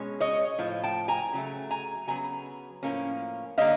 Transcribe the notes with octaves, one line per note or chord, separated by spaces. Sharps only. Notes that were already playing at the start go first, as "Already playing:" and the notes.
Already playing: B2 G#3 C#4
C#5 D#5
A2 F3
G5 A5
G#5 A#5
C#3 F#3 A3
G#5 A#5
C#3 F#3 B3 G#5 A#5
A2 F3 A#3 C#4
D3 G3 A#3 D#5 F5